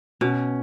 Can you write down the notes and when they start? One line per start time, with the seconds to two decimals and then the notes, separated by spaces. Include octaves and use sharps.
0.21 B2 C#4